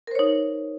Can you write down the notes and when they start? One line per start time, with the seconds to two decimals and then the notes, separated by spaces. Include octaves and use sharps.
0.07 A#4
0.11 C5
0.15 C#5
0.19 D#4